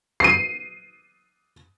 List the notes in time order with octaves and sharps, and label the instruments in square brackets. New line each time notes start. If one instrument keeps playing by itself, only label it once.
[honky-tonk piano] C7 D#7